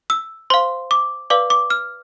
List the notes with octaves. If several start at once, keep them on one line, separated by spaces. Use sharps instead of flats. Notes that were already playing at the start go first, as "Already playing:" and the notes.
E6
C5 F5 C6
D6
B4 D5 F5 D6
D6
F6